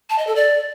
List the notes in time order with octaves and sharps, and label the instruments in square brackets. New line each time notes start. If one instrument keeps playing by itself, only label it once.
[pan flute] A5
D#5
A4
D5